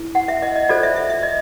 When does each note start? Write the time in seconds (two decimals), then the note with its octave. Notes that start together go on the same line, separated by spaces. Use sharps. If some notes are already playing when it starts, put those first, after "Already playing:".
Already playing: E4
0.15 F#5
0.28 E5
0.42 D#5
0.56 D#5
0.69 F4 A4 C5 D5
0.83 E5
0.96 E5
1.10 E5
1.23 D#5